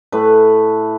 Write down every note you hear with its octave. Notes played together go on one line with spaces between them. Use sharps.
A2 A3 B4